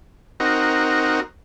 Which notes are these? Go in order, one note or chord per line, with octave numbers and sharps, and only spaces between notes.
C4 D#4 F#4 A#4